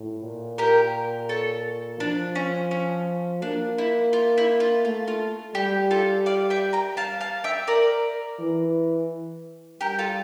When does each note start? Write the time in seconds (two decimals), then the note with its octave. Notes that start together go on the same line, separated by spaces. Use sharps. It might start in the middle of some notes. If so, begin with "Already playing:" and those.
Already playing: A2
0.23 A#2
0.58 G4 A#4
1.29 A4 C#5
2.00 F3 D4
2.35 C#4
2.71 C#4
3.42 A#3 D4
3.78 E4
4.13 F4
4.38 E4
4.60 F4
4.84 A3 F4
5.08 F4
5.55 G3 G4
5.91 F4 A4
6.26 D5 F5
6.50 E5 G5
6.73 G5 A#5
6.97 F5 A5
7.20 F5 A5
7.44 E5 G5
7.67 A#4 D5
8.40 E3
9.80 G3 G4 A#4
9.99 F4 A4